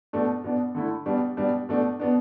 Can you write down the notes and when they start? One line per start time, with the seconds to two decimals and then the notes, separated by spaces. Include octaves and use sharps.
0.13 B2 A3 D4
0.44 B2 B3 D4
0.75 D3 A3 E4
1.06 B2 G3 D4
1.37 B2 G3 D4
1.69 B2 A3 D4
2.00 B2 B3 D4